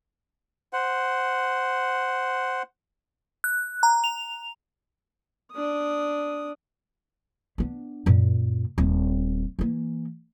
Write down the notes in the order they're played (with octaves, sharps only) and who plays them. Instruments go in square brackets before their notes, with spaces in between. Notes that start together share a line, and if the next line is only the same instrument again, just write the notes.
[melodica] C5 F#5
[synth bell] F#6
A#5
F7
[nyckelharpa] D4 D#6
[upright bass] B3 D4
F#2 A#2
D#1 C4
E3 A#3